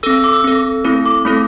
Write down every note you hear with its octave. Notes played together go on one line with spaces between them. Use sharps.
C4 A4 E6
E6
D6
E6
C4 A4
A3 C4 E4 A4
D6
A3 C4 E4 A4